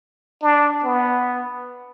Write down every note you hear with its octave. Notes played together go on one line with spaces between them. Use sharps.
D4
B3